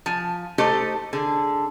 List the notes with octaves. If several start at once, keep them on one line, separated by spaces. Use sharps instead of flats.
F3 G#5
A3 D#4 G4 A4 C5
D3 G#4